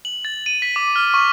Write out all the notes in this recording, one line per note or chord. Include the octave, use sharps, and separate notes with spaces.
F#7
A6
D#7
B6
D6
F6
C#6